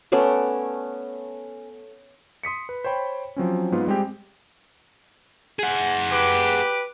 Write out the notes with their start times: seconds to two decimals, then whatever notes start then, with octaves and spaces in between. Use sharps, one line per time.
0.12 A3 B3 C#4 D5
2.43 C6 D#6 B6 C#7
2.69 B4
2.84 C5 C#5 G5 B5
3.36 F3 F#3 C4 C#4
3.72 G#2 B3 F4
3.87 G3 G#3 C4 G4
5.59 G#4 F#5
6.11 G4 B4 D6